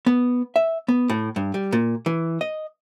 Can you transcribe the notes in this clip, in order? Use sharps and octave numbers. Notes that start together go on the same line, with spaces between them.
B3
E5
B3
A2
G2
G3
A#2
E3
D#5